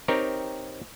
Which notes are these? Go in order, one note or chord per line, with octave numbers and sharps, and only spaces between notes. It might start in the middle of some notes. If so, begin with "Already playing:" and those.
C4 D#4 G4 A#4 C#5